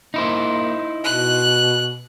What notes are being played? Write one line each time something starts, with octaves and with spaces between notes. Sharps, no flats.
A#3 D#4 E4 C5
B2 F#6